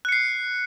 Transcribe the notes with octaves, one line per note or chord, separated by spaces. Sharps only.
F#6 C7 C#7